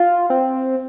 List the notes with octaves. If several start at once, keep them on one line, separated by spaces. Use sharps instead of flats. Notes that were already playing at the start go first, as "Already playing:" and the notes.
Already playing: F4
C4